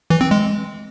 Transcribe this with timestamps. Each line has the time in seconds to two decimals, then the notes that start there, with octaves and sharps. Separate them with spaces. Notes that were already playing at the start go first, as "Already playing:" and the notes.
0.10 E3
0.21 C4
0.31 G#3